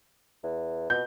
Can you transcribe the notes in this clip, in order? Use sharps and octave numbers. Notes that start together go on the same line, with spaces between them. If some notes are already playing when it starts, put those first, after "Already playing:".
E2
B2 G6